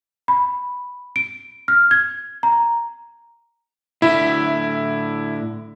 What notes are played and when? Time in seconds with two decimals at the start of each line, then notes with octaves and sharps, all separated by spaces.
0.28 B5
1.16 D7
1.68 F6
1.91 G#6
2.43 A#5
4.02 A2 D3 E4 E5